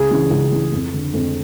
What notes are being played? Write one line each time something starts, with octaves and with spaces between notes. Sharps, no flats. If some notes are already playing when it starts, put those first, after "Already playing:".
Already playing: C#2 G#4
C#3 E3
C#2
C#3 E3
F2
D3
F2